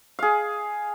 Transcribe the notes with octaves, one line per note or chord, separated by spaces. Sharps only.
G#4 F5